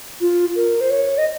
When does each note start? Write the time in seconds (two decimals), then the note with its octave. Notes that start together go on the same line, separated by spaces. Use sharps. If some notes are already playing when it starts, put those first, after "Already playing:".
0.21 F4
0.56 A#4
0.81 C5
0.90 C#5
1.18 D#5